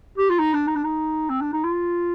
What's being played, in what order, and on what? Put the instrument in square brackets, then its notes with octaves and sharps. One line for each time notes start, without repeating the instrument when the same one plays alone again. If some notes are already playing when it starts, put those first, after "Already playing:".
[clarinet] G4
F4
D#4
D4
D#4
D4
D#4
C4
D4
D#4
F4